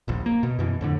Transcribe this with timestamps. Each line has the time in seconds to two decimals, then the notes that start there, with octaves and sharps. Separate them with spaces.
0.08 D#1 A#1
0.26 A#3
0.43 B2
0.59 F#2 B2 E3
0.81 F2 A2 D3